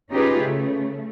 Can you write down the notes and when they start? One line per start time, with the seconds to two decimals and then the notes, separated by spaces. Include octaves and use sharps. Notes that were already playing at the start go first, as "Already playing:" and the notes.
0.11 C#4 D#4 F4 G4 G#4 B4
0.40 C#3 A3